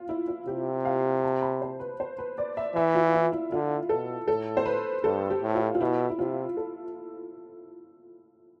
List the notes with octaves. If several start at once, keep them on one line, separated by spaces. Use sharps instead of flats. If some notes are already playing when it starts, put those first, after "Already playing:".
Already playing: F4
E4
F4
C3 G4
F5
A5
B5
C5
B4
C5
B4
D5
E5
E3 E5
F4
E4
E4
D3 F4
B2 A4
A2 A4
C5
B4
G2 A4
G4
A2
F4
F4
B2 E4
E4
C3 F4
A4